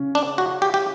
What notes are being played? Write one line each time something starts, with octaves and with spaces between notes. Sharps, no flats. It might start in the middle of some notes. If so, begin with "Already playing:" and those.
Already playing: C#3 C#4
D4
F#4
G4
G4